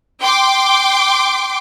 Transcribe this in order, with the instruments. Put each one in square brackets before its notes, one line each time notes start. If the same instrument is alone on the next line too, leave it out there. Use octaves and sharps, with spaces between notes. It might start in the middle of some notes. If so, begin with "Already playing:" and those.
[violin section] G5 C6 D6